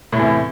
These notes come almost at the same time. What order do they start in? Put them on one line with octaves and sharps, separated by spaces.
A2 C3 E2